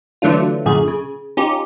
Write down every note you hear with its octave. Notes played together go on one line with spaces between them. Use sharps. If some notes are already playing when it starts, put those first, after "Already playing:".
D3 E3 F#3 A3 D4 F4
F#2 A#2 D3 G#4
C#3
C#4 D#4 F4 G4